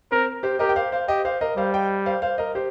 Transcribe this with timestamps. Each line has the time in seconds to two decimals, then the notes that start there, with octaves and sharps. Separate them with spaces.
0.12 C4 A#4
0.43 G4 C5
0.59 G4 A#4 D#5
0.69 G5
0.76 C5 F5
0.92 C5 F5
1.08 G4 D#5 G5
1.25 C5 F5
1.41 A#4 D#5
1.57 G3 C5 F5
1.74 D#5 G5
2.06 C5 F5
2.22 C5 F5
2.38 A#4 D#5
2.55 G4 C5